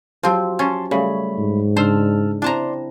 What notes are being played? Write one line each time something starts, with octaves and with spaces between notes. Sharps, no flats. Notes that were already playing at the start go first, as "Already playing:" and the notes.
F3 F#3 C4 G4 C5
C#4 A5 C6 A6
C#3 G3 A3 C#5 B5
G#2
C#3 D4 C5 A5 E6 F6
C4 D4 E4 D5 A5 A#5 C6